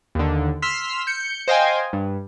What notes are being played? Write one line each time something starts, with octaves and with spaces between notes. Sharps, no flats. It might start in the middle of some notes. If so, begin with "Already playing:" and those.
D#2 D3
C6 E6 F6 B6
G6 C#7
C5 D#5 F5 G5 G#5
G2